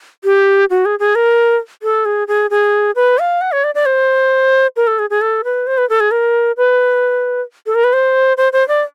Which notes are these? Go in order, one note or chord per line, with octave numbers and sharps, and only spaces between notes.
G4
F#4
G#4
G#4
A#4
A4
G#4
G#4
G#4
B4
F5
F#5
C#5
D5
D5
C5
A#4
A4
G#4
G#4
A4
B4
C5
B4
A4
G#4
A#4
B4
A4
A#4
B4
C5
C5
C5
D5